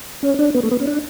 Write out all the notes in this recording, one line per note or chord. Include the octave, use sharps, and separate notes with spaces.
C#4
D4
B3
A3
B3
C#4
D4